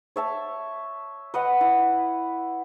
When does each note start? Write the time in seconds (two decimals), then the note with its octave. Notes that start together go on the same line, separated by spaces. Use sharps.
0.16 C#5 E5 A5
1.34 B4 D#5 F#5
1.61 E4